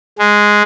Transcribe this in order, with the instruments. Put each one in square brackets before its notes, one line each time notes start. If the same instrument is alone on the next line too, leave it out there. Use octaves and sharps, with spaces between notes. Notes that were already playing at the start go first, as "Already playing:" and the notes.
[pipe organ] G#3